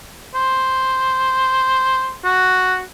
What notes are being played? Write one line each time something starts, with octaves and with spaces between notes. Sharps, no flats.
C5
F#4